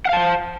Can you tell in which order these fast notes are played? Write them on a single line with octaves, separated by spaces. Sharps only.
F#5 F5 A5 C5